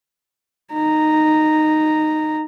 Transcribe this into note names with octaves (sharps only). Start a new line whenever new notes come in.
D#4 A#5